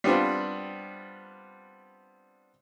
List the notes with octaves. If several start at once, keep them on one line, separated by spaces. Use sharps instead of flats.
G3 B3 C4 D4 F4